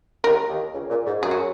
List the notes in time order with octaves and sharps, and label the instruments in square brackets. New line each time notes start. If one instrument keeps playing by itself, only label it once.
[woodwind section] D#2 D#3 [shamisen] A#4
[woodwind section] D#2 D#3
C#2 C#3
A#2
G#2
[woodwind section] F#2 F#3 [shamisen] G#4
[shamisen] F#4